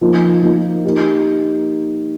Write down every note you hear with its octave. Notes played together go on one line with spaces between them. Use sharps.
F3 A#3 D#4
F3 A#3 D#4
A#3 D#4 G4